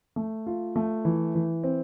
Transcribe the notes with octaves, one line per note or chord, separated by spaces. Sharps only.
A3
F4
A3
E3
E3
C4